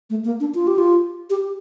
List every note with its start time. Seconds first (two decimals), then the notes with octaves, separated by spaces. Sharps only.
0.10 A3
0.25 A#3
0.40 D4
0.55 F4
0.67 G4
0.78 F4
1.30 G4